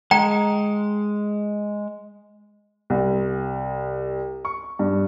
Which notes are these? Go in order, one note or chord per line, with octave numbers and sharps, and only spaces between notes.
G#3 G5 A#5
C2
C#6
G2